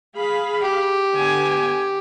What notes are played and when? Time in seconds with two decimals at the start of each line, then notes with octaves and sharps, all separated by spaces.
0.17 G#4 F5 B5
0.62 G4
1.13 D3 B3 G#5